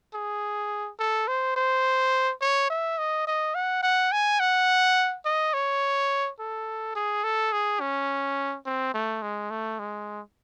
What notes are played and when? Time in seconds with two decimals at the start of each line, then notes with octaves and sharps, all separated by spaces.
0.14 G#4
0.99 A4
1.28 C5
1.56 C5
2.41 C#5
2.70 E5
2.98 D#5
3.27 D#5
3.55 F#5
3.83 F#5
4.12 G#5
4.40 F#5
5.25 D#5
5.54 C#5
6.39 A4
6.95 G#4
7.24 A4
7.52 G#4
7.80 C#4
8.66 C4
8.94 A3
9.22 G#3
9.50 A3
9.79 G#3